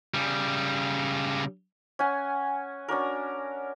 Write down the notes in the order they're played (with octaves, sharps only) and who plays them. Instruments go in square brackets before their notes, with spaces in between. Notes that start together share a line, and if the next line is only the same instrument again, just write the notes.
[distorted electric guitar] C#3 G3
[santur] C#4 F#5 G#5
C#4 D4 F#4 A#4